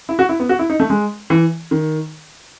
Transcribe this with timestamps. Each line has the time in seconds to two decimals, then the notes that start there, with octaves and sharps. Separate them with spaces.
0.09 E4
0.19 F#4
0.29 E4
0.40 B3
0.49 F#4
0.59 E4
0.70 D#4
0.80 A3
0.90 G#3
1.30 E3
1.71 D#3